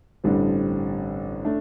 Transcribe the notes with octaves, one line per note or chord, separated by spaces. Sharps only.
A1 G2 D3 G3 C4
A3 D4